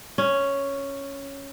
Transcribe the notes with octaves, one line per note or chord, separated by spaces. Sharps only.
C#4